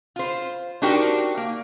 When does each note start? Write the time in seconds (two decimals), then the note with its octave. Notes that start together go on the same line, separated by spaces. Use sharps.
0.16 F4 C5
0.82 D4 D#4 F#4 G4 A#4 C5
1.37 A#3